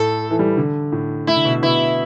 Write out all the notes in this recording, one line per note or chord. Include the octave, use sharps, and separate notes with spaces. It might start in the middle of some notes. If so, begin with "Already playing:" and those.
Already playing: A2 A4
E3
G3
E3
D3
A2
A3 E4
D3
B2
B2 E4